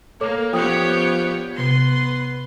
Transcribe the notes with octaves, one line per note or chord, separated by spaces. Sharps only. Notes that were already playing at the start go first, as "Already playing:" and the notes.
A#3 A4 C#5 D6
F3 B3 G4 C#5 G5 D#6
C3 B3 B4 C6